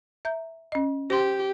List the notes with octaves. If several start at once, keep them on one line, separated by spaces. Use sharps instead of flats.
E5 A#5 G6
C#4 D#5
G4 C5 C6